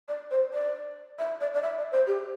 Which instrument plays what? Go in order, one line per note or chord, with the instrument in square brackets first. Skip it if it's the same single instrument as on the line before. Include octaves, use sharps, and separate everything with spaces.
[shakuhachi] D5
C5
D5
E5
D5
D5
E5
D5
C5
G4